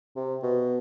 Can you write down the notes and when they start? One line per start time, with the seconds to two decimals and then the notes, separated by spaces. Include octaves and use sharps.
0.16 C3
0.43 B2